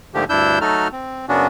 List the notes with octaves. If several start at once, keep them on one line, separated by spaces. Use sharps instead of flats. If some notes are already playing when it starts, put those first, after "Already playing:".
G#2 D3 F3 A3 A#3 G4
D2 G2 D4 E4 E6 G6
F#3 A3 D#4 F#4 A4 F6
C4
F#2 C#3 B3 C#4 D4 F#4